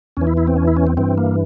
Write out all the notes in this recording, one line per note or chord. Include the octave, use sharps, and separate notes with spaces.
E2 E3 C#4
E4
E4
C4
C#4
E4
C#4
C4
G2 E3 C4
A#3